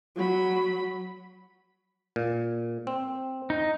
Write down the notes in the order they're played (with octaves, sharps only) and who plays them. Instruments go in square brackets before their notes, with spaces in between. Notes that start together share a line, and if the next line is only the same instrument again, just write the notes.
[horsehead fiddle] F#3 B5
[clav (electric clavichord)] A#2
C4
[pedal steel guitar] D#4